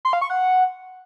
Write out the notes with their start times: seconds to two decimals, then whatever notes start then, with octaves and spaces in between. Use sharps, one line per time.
0.05 C6
0.13 F5
0.21 C#6
0.30 F#5